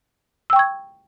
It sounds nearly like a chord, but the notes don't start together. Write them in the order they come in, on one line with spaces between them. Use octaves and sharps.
E6 G5 C#6 G#6